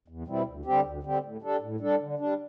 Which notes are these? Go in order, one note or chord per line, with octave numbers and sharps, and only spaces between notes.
E2
B2 G3 C4 E4
D2
D3 G3 C4 G4
D2
D3 G3 C4 G4
A2
G3 D4 A4
A2
G3 D4 A4
D3
G3 D4